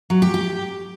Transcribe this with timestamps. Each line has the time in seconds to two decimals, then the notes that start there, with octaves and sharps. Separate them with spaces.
0.10 F#3
0.22 G4
0.34 G4